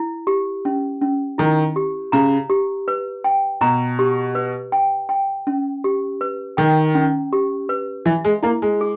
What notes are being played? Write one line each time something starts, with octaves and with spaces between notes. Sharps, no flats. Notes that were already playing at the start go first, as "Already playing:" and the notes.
Already playing: E4
G4
C#4
C#4
D#3 E4
G4
C#3 A#5
G4
B4
G5
B2 A#5
G4
B4
G5
G5
C#4
G4
B4
D#3 G5
C#4
G4
B4
E3 E5
G#3
A#3 E4
G#3
G#4